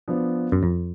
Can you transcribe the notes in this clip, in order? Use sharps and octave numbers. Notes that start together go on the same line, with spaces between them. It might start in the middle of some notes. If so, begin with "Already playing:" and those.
F3 B3 D4
F#2
F2